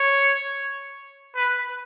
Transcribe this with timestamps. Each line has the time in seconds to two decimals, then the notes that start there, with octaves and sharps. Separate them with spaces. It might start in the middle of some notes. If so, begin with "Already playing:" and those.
Already playing: C#5
1.35 B4